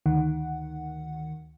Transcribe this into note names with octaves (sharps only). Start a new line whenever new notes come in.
D2 D#3 F#5